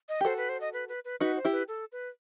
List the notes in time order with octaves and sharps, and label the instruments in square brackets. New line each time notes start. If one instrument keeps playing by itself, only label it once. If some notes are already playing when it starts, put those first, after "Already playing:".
[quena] D#5
[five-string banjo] G4
[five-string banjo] F#4 A4 [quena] C5
[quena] B4
C5
D#5
B4
B4
B4
[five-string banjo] D#4 F#4 [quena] B4
[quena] C5
[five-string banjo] E4 G4
[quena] B4
A4
B4